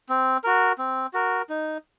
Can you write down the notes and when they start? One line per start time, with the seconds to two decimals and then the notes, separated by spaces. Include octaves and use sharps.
0.09 C4
0.44 F#4 A#4
0.79 C4
1.14 F#4 A#4
1.50 D#4